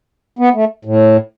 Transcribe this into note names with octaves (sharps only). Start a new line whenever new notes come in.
B3
A3
A2